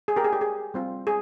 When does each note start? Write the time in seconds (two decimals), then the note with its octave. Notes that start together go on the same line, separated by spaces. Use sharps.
0.08 G#4
0.16 G4 A#4
0.24 G#4
0.33 G4
0.41 G#4
0.74 G3 C4 F4
1.07 G#4